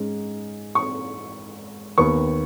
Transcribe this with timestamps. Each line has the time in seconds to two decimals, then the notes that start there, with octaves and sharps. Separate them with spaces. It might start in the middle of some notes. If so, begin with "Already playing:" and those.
Already playing: G#2 G#3 C#4
0.75 C#6
1.97 D#2 D#3 B3 C#6